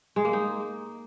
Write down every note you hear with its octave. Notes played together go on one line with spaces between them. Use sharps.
G#3
A#3
D#4